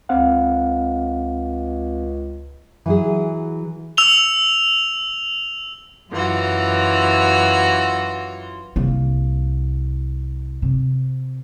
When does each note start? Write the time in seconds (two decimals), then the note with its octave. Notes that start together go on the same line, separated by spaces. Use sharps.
0.09 C#2 C4 F5 F#5
2.86 E3 F#3 G#4
3.97 E6 F7 G7
6.10 F#2 E3 F4 F#4
8.76 C2 A#3
10.62 C3